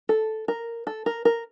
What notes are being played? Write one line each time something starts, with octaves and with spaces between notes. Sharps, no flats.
A4
A#4
A4
A#4
A#4